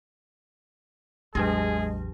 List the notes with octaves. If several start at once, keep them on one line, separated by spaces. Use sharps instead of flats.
A1 E2 F#3 G#3 D4 G4 G#4